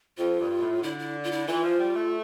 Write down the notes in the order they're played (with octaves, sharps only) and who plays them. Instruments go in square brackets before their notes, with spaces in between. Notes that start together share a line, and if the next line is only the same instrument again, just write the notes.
[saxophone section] F2 [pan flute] F4
[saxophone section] G2
B2
A2
[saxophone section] D3 [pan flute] E4
[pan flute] E4
F4
E4
[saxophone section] E3 [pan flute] F4
[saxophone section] F3
G3
A3